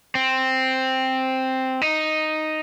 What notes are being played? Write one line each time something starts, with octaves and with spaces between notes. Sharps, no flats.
C4
D#4